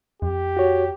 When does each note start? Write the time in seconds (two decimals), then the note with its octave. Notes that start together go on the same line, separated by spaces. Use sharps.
0.22 F2 G4
0.57 F#4 C#5